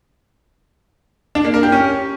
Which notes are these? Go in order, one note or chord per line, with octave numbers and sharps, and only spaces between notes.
D4
A#3
A#4
G4
C#4